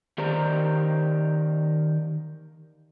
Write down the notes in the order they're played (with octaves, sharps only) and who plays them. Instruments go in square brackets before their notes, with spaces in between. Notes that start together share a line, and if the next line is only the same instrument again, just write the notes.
[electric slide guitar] D#3 G4 A#4 C5 D5 A#5